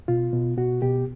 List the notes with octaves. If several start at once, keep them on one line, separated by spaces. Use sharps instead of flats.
B2 F4
B2
B2 F#4
B2 G4